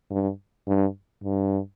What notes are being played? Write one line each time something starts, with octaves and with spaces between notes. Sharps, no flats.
G2
G2
G2